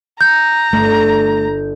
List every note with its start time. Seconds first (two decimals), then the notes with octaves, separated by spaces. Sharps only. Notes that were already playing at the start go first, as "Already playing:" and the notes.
0.21 A#5 G6
0.73 G1 A3